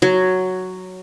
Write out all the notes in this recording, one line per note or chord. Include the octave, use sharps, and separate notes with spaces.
F#3